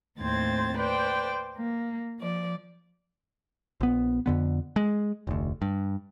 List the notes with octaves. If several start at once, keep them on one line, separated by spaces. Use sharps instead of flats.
D#2 A2 C4 C5 G#6 A6
B4 C5 D5 G5
A#3
F3 D5
A#1 B3
F2 D3 B3
G#3
F1 D2
G2